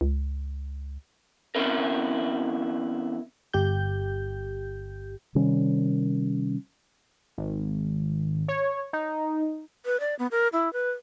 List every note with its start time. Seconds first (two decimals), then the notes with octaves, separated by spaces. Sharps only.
0.01 C#2
1.55 E2 F#3 C4 C#4 E4 A#4
3.54 G1 G4 G6
5.35 C3 D#3 G3 C#4
7.38 G#1
8.48 C#5
8.93 D#4
9.86 B4
10.00 D5
10.19 B3
10.31 A#4
10.53 E4
10.73 B4